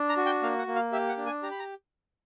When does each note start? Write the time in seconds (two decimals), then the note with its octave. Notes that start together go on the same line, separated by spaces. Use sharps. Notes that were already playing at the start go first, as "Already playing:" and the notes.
Already playing: D4
0.09 A#5
0.17 F#4
0.26 G5
0.43 A#3 F5
0.59 F#5
0.67 A#3
0.75 F5
0.92 G4 E5
1.09 F#5
1.17 D4
1.26 G#5
1.43 G4 A#5
1.51 B5
1.59 A#5